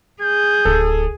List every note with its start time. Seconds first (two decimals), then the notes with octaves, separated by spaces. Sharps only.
0.22 G#4 G6
0.65 D1 A4